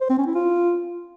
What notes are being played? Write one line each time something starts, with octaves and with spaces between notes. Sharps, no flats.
C5
C4
C#4
E4
F4